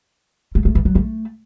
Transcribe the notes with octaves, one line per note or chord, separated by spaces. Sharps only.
A3
A3
E3
F#3
A3